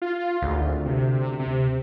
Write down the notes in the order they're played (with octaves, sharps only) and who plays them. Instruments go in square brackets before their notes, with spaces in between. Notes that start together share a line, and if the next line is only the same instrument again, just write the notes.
[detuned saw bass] F4
[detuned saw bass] G#1 [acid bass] D2
[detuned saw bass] C3
C3